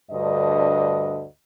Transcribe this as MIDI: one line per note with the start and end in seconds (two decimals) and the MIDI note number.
0.10 1.22 38
0.10 1.22 43
0.10 1.22 50
0.10 1.22 75